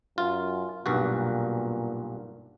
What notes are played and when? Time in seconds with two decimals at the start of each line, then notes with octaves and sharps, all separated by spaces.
0.18 F#2 F4
0.86 B1 G2 A#2 F#4